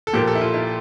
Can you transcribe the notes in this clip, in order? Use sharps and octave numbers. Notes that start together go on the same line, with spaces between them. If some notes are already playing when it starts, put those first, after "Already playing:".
A4
A#2 F3 A#3 G4
A4
E4
F4
E4